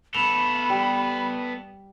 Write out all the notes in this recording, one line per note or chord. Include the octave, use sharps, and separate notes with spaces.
B3 A4 B5 E7 F7
G3